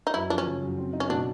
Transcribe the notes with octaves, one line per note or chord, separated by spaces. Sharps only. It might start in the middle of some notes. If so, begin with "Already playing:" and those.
D#4
F#2 E4
F3 D4
C#4
C#3
F#2
C4
D#4
C#4
B2 D4